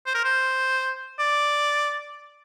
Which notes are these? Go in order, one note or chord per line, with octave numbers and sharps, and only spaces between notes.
C5
A#4
C5
D5